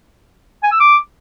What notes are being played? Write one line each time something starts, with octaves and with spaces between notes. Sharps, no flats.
G#5
E6
D6